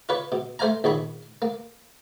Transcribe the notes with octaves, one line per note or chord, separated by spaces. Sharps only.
F4 B4 C#5
B2
A3 C5 F5 G#5 A#5
A#1 D#2 C#5 B5
A#3